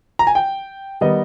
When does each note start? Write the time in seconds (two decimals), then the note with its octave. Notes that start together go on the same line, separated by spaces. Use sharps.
0.19 A#5
0.27 G#5
0.35 G5
1.01 D#3 G3 B3 D#4 D#5